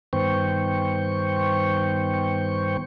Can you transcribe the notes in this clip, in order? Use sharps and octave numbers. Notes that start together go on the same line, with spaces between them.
G2 D#3 B3 C5 G5 C#6